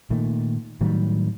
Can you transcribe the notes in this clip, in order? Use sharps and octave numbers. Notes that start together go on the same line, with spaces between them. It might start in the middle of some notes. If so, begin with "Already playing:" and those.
A#2 D#3 A3
A2 D#3 F#3 G3